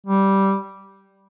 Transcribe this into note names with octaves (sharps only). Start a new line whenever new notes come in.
G3